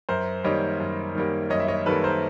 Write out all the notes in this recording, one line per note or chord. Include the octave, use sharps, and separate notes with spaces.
F#2 A#4 C5
D#3 G3 A#3 C#5 D#5
F#2
D#3 G3 A#3
F#2 C#5 D#5
E5
C#5 D#5
D#3 G3 A#3 A4 B4
A#4 C5